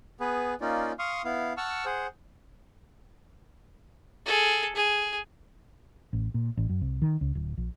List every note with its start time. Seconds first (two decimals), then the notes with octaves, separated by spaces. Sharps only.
0.20 B3 G#4 B4
0.61 A#3 C#4 D#4 F4 D5
0.99 F5 C6 C#6 D#6 F6
1.24 B3 E4 F5
1.57 F#5 A5 C#6 E6 F6
1.85 G#4 C5 F#5
4.26 G#4 A4
4.76 G#4
6.13 A1
6.34 A#2
6.57 A1
6.69 F#2
6.81 C2
7.02 D#3
7.21 C#2
7.35 D1
7.57 A#1